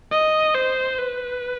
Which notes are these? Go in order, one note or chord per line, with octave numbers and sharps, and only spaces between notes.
D#5
C5
B4